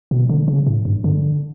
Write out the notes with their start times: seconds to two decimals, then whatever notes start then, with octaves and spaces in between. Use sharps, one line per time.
0.11 B2
0.29 D3
0.48 C#3
0.67 A2
0.85 G2
1.04 D3